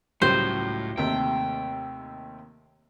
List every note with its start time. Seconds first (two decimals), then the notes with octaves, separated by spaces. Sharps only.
0.22 C#2 A2 F#3 G3 C5
0.98 D#2 C3 A3 G5